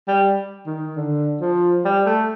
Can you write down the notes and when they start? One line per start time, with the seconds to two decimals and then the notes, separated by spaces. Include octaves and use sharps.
0.08 G3
0.66 D#3
0.96 D3
1.41 F3
1.85 G3
2.06 A3